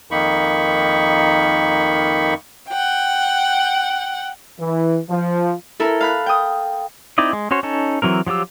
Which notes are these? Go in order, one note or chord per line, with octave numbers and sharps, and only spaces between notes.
F2 D#3 A#3 D#4 B5 C#6
F#5 G5
E3
F3
E4 A4 A#4
F5 B5 F#6
G5 D#6
C4 D#4 E4 D5 D#5
G#3
C#4 F#4 C5 C#5
C#4 D#4 A4
E3 F#3 C4 A#4
F3 F#3 F4 G4 E6